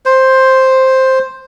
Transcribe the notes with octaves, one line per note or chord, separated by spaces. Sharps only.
C5